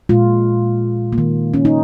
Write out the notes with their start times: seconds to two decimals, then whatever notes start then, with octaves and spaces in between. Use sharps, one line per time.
0.09 A#2 G#3 F4
1.13 A#3
1.18 D#3
1.54 C#4
1.65 D#4